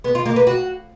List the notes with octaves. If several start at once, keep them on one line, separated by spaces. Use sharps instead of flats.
B3
F4
A#3
B4
F#4